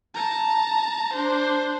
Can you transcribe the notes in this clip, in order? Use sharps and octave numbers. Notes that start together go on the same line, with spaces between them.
A5 A#5
D4 C5